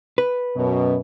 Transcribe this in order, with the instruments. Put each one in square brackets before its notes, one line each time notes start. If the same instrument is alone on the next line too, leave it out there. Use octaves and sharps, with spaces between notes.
[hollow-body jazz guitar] B4
[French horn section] F#2 B2